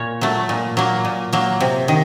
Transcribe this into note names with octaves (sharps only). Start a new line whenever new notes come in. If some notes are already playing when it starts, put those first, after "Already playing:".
Already playing: A#2 C#5
F#3 A3
A#2
F#3 A#3
A#2
F#3 A#3
C3
D#3